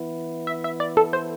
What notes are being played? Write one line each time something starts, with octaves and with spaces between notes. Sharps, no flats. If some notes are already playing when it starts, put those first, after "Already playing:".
Already playing: E3 B3 E4
E5
E5
D5
A4
C5